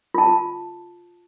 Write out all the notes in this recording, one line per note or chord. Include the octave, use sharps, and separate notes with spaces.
F4 A5